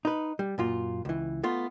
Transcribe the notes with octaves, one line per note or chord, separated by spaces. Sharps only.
D#4 B4
G3
F#2 A#2 F4
C#2 E3
A3 B3 F4